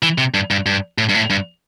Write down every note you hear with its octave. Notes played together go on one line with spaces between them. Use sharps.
E3
C3
G2
G2
G2
A2
G2
A2
G2